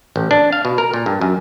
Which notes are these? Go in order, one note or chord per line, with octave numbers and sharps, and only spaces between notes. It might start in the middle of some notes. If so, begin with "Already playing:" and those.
A1
D4
F5
B2
A#4
A#2
G2
F#2